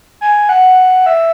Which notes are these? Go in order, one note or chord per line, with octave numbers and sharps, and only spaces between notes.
G#5
F#5
E5